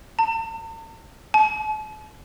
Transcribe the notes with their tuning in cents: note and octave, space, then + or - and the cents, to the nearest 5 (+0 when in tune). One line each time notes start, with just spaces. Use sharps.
A5 +45
A5 -40